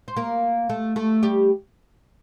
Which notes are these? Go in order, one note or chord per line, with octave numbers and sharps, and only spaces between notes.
C5
A#3 A#4
A3 A4
A3 A4
G3 G4